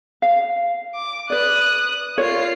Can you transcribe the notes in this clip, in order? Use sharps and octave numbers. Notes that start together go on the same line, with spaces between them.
F5
D6
B4 D5 D#6 F#6
F4 A#4 C#5 D5 C7